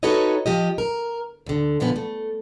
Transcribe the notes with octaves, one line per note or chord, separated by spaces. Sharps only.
D#4 F#4 A4 B4 C#5 D#5
F3 G4 D#5
A#4
D2 D3
A#2 D3 F3 B3
A3